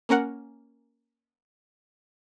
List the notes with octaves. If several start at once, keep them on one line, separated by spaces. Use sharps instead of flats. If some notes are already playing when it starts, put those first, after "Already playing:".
A#3 C#4 A#4 F#5